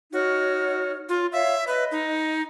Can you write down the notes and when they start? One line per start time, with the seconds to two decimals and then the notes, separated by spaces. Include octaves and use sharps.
0.13 D#4 F#4 C#5 F6
1.09 F4
1.32 C#5 E5 F5
1.67 B4 D#5
1.91 D#4